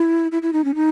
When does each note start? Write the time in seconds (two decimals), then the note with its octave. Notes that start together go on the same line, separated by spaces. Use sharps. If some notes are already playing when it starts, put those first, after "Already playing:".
Already playing: E4
0.32 E4
0.42 E4
0.53 D#4
0.64 C#4
0.75 D#4